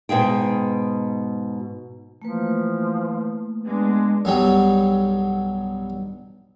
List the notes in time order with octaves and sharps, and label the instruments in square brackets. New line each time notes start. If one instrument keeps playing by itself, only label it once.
[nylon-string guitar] G#2 B2 G#4 G5
[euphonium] E3 [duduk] F3 [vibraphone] A3 A#3 B4
[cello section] G#3 [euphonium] B3 [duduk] D4
[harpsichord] B1 G2 F#3 G5